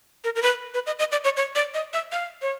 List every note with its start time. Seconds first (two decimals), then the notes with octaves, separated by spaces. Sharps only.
0.24 A#4
0.36 A#4
0.42 B4
0.74 B4
0.86 D#5
0.99 D#5
1.12 D5
1.24 C#5
1.37 C#5
1.55 D5
1.74 D#5
1.93 E5
2.12 F5
2.42 C#5